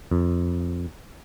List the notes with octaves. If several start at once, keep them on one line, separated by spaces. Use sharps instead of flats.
F2